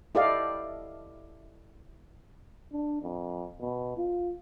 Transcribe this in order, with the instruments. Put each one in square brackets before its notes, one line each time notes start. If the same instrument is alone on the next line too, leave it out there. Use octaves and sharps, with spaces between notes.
[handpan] E4 G4 A4 D5 D#5 F5
[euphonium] D4
F2
B2
F4